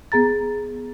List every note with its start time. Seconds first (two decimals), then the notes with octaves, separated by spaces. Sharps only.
0.12 B3 G#4 A#5 A6